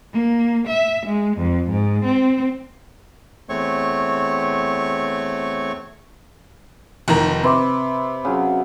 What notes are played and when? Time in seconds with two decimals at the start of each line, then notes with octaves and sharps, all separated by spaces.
0.12 A#3
0.66 E5
1.06 G#3
1.36 F2
1.68 G#2
2.04 C4
3.49 E2 A3 C4 C#5 C#6
7.08 F1 D#3 A#5
7.43 C3 B4 C6 D6
8.25 C#3 F#3